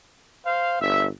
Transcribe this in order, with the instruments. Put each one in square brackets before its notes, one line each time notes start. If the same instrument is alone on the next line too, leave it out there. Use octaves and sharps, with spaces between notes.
[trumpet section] C5 F5
[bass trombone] G1 [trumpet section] E5